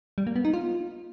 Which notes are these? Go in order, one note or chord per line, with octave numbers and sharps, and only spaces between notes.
G3
A#3
B3
D#4
F4